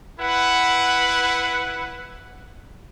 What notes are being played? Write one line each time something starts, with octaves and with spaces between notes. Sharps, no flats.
E4 B4 F#5